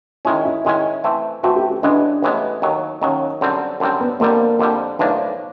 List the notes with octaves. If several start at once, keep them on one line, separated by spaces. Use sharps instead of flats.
D#3 G#3 C#4 E4
E4
D#3 G#3 C#4 E4
E3 A3 C4
E3 A3 C4 F#4
G4
G4
A1 A2 E3 G#3 B3 D4
A1 A2 E3 G#3 B3
D#2 D#3 F#3
D#2 D#3 F#3 C#4
F#2 D3 G3 C4
F#2 D3 G3 C4
B3
F2 D3 G3 A#3
F2 D3 G3
B1 A2 F3 A#3 D4